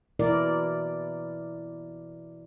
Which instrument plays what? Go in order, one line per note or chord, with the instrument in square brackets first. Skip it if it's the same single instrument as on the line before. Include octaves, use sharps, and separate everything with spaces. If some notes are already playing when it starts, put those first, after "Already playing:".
[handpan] B2 E3 E4 A#4 D5